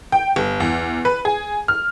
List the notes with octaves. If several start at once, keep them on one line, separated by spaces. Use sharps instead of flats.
G5
G1
E2
B4
G#4
F6